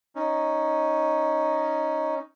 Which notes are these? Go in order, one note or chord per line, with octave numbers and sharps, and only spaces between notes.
C#4 D#4